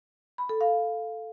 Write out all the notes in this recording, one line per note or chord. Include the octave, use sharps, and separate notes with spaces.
B5
A4
F5